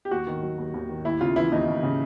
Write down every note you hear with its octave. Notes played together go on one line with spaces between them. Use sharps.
G4
D#2 F#4
D#3
F#3
D#2
D#2
D#3
D#2 E4
C#3 F4
E3 E4
D#2 D#4
D#2
C#3